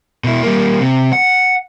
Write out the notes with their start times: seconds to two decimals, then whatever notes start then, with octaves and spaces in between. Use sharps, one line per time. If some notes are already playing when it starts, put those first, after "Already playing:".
0.24 B2 E4
0.42 G3 A#3
0.80 C3
1.13 F#5